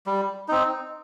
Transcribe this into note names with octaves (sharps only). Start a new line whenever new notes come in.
G3
C4 D#4